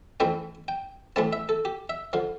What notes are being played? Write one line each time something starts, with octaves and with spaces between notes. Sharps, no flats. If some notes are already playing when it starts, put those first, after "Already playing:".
F2 E3 A3 C4 G5
G5
A2 E3 A3 C4 A5
E5
A4
G4
E5
D3 F3 F5